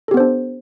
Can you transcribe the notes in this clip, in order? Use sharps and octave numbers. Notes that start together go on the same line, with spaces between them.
B3 D4 G4 A4 C5